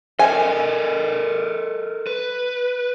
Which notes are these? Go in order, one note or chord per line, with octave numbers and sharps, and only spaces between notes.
A4 A#4 D#5 G#5
B4